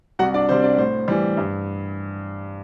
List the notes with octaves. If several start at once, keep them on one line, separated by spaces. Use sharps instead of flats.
C2 F#4 F#5
D4 D5
C3 G3 C5
D4 D5
A2 C5
E3 G3
G2